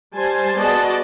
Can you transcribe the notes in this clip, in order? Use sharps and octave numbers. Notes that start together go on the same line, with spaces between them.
G3 C5 G#5 A5 C6
B3 F#4 G#4 D5 D#5 A5